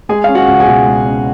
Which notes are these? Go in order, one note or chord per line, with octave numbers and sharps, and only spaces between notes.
G#3 G#4 G#5
C#4 F5
F#4 F#5
C#2
G#4 G#5
B2
G#3
C#4